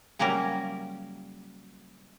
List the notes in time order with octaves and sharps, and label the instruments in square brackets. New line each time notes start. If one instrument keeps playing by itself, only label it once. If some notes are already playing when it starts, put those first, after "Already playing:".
[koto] C#3 F#3 G3 A#3 C#4 A#4